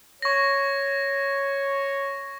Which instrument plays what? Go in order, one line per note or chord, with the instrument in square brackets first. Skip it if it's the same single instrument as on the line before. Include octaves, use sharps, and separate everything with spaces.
[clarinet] C#5 [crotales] C#6 A#6